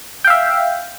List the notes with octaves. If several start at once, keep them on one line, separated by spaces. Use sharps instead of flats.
E5 F5 G5